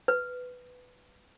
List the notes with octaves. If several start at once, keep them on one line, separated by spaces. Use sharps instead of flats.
B4